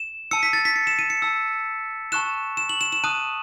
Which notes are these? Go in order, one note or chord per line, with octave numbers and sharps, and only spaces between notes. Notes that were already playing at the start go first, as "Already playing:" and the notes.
Already playing: E7
A5 E6 C#7
B6
A6
B6
C#7
E7
D#7
C#7
A5 E6
A5 C#6 F#6 E7
E7
F#7
E7
E7
A5 D#6 F#6 D#7